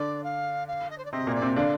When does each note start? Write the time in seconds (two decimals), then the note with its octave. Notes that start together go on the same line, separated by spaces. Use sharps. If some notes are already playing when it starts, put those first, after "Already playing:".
Already playing: D3 D4 D5
0.23 F5
0.68 F5
0.90 D#5
0.98 C5
1.05 D5
1.12 C3 C4 D#5
1.27 A#2 A#3
1.35 D5
1.42 C3 C4
1.56 D3 D4 F5